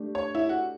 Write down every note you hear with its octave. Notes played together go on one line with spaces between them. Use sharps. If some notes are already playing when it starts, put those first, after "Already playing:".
Already playing: A3 D4 G4
C#5
E4
F#4